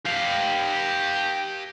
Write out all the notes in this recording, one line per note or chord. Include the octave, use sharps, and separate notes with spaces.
G4 F5